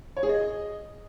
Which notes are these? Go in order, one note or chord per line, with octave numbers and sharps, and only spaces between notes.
C#5
G#4
D#5